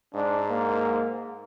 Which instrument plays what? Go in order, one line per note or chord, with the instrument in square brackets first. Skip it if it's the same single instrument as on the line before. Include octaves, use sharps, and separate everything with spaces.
[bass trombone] G#2 [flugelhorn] D4
[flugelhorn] A#3